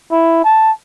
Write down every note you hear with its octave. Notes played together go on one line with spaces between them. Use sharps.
E4
A5